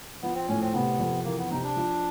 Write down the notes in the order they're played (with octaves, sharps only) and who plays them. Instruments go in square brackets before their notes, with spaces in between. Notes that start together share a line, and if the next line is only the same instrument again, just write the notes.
[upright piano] F3 [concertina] B3
[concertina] C4
[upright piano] A2 [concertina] C#4
[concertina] C4
[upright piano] C3 [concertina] B3
[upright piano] F2
[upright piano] E3 [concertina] A#3
[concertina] B3
[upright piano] C3 [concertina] D#4
[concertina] D4
[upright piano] F3